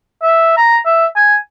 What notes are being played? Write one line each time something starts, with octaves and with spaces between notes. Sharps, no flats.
E5
A#5
E5
G#5